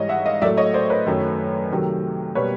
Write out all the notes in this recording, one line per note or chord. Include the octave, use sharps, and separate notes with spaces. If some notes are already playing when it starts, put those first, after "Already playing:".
Already playing: G#2 E3 G3 C#5 D#5
E5 F#5
D#5 F5
A2 F#3 A3 D5 E5
C#5 D#5
C5 D5
B4 C#5
F#2 D#3 F#3 A3
C3 D#3 F#3 A3
B2 G3 A#3 B4 C#5